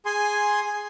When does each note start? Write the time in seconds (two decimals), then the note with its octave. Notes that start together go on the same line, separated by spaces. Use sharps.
0.06 G#4 G#5 C6